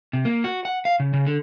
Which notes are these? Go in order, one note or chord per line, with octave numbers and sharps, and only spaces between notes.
C3
A#3
F#4
F#5
F5
C#3
C#3
D3